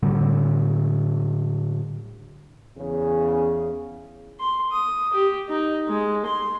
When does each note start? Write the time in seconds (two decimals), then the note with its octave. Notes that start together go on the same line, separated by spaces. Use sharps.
0.03 A2 D3 G3
2.77 E2 C#3
4.40 C6
4.72 D#6
5.13 G4
5.49 D#4
5.89 G#3
6.26 C6